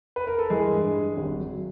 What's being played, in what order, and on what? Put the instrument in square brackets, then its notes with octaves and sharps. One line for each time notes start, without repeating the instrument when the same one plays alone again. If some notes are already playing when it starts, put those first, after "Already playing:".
[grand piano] B4
A#4
A4
E3 G#3 G#4
G2
G3
G#1
F#3